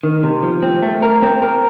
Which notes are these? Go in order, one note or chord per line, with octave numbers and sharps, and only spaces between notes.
D#3
C3
F3
C4
A3
A#4
C4
A#4